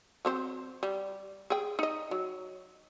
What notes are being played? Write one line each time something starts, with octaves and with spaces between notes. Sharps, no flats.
F#3 C4 C5
G3
G#4 G5
D#4 D#5
F#3